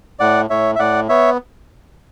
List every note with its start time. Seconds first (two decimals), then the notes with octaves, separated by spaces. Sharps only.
0.19 A2 D5 F#5
0.50 A2 C#5 E5
0.75 E5
0.79 A2 D5 F#5
1.09 B3 C#5 E5